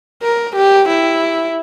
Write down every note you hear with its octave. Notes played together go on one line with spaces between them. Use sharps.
A#4
G4
E4